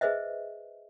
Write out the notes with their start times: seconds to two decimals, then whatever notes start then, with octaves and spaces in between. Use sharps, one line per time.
0.01 G#4 B4 C5 D#5 E5